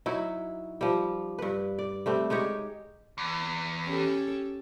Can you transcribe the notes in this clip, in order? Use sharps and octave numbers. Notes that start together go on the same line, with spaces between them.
F#3 D#4 E4
F3 G3
G2 B4
D5
G3 A3 C4
G#3 D#4 G4 C#5
E2
C#4 G4 A4